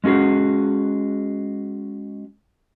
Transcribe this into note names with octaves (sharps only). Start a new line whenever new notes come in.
G#3 C#4 F#4 G#4